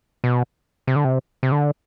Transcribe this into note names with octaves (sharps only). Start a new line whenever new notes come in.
B2
C3
D3
C3
C3
D3